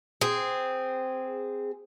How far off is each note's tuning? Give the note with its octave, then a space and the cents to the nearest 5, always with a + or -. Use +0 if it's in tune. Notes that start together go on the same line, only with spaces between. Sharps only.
C4 -10 G#4 -10